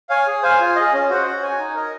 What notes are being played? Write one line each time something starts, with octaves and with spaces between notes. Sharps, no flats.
C#5 F5 G#5
G#4
C5 F5 G#5
F4
G#4 D#5
C#4
F#4 C5 F#5
F#4
C#5 G#5
D#4
A#4 D#5